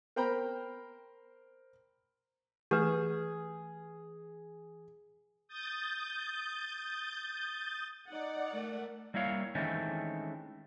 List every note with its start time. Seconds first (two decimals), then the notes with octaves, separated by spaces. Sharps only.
0.16 A#4 C5 G5 A#5 B5
2.71 E3 A3 G4 G#4 B4
5.48 D#6 G6 A6
8.11 D#4 D5 F#5
8.53 A3 A#4
9.14 G3 A#3 E4 C#5 F5
9.55 D#3 E3 G#3 A3 C4 C#4